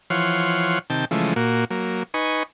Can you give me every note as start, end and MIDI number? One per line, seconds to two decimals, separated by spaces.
0.10 0.79 52
0.10 0.79 53
0.10 0.79 73
0.10 0.79 78
0.10 0.79 84
0.10 0.79 89
0.90 1.05 48
0.90 1.05 51
0.90 1.05 79
0.90 1.05 81
1.11 1.34 49
1.11 1.34 52
1.11 1.34 53
1.11 1.34 56
1.11 1.34 57
1.36 1.65 46
1.36 1.65 58
1.36 1.65 66
1.70 2.03 54
1.70 2.03 58
2.14 2.43 63
2.14 2.43 71
2.14 2.43 80
2.14 2.43 85